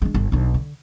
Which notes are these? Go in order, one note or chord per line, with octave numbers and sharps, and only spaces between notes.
G#3 D4
G1
B1 D4
D3